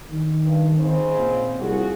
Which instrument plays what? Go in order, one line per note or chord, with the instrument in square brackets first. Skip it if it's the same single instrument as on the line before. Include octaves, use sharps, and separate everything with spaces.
[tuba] D#3
[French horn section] G2
G#2 C#3 C4
[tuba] A#2
[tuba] C2 [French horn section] F3 F#4 G#4